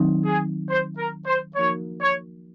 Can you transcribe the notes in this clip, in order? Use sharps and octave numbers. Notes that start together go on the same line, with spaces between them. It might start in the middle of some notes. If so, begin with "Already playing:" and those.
Already playing: D#3 F#3 C4 D#4
G#4
C5
A#4
C5
F3 A#3 D#4 F#4 A#4 C#5
C#5